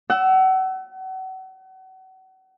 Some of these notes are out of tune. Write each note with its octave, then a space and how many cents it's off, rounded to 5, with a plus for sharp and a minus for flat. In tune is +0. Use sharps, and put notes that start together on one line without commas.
F#5 +35 E6 +0